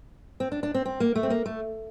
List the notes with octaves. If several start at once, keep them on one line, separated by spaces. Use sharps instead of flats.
C4
D4
D4
C4
C4
A#3
A3
C4
A#3
A3